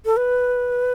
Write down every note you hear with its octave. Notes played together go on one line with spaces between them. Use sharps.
A4
B4